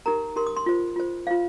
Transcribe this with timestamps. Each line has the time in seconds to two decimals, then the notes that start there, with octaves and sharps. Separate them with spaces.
0.06 D#4 G4 A#4 A#5
0.36 D#4 G4 A#4 C6
0.47 D#6
0.56 C6
0.66 F4 C5
0.96 F4 C5
1.27 F4 C5 F5